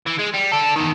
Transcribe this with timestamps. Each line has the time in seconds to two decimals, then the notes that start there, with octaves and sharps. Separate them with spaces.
0.07 E3
0.19 G#3
0.34 G3
0.52 D4 A4
0.76 E2 D#3